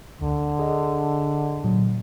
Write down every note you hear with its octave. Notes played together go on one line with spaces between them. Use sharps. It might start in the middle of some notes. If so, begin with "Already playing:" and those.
D2 D3
G#4 D#5
A#2 F#3